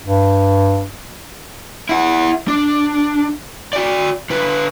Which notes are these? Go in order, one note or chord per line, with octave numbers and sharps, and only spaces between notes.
G2
E4 F#5
D4
F#4 D5
D3 B4